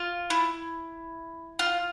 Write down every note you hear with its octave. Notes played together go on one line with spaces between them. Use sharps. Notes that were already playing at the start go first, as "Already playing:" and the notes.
Already playing: F4
E4
F4